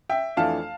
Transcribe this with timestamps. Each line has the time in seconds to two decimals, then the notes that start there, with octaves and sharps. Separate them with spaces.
0.09 E5 G5
0.37 F2 E3 A3 D4 F5 A5